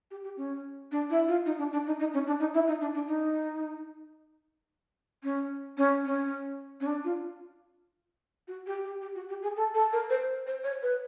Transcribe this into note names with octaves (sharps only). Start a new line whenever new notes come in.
G4
G4
C#4
D4
E4
F4
D#4
D4
D4
D#4
D#4
C#4
D4
D#4
E4
D#4
D4
D4
D#4
C#4
C#4
C#4
C#4
D4
F4
F#4
G4
G4
G4
F#4
G4
G#4
A4
A4
A#4
C5
C5
C#5
B4